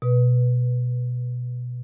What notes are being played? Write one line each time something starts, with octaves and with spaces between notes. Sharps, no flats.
B2 B4